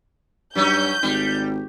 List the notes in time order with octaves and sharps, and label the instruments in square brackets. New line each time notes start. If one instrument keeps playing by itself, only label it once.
[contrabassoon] G2 [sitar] F#3 C#4 D#4 [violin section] G6
[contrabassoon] G#1 [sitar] G3